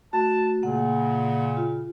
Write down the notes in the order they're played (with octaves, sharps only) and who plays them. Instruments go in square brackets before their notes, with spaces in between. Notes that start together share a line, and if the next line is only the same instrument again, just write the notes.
[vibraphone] A3 F#4 [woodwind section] A5
[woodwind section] A#2 C#3 [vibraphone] A#3 F#5
[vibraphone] F4